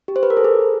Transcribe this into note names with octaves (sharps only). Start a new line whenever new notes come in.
G4
C5
B4
A#4
A4
G#4